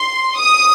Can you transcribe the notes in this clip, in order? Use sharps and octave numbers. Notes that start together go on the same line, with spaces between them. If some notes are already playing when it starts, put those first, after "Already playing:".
Already playing: C6
D#6